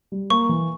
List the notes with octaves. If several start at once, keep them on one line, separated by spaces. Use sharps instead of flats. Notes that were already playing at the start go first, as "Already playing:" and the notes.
G3
A#3 C#6
E3